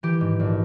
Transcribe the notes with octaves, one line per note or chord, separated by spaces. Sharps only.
E3 G4
G#2
A#1